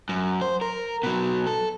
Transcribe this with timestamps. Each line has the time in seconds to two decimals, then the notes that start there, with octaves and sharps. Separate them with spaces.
0.09 F#2
0.41 C5
0.61 A#4
1.03 B2 F#3
1.47 A4